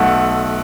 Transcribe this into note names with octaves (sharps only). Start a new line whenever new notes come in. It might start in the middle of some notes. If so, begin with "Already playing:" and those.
Already playing: B1 A3 F#5